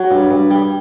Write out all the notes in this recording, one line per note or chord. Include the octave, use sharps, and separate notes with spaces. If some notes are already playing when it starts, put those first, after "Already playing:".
Already playing: F#3 F#4
G2
G2
G3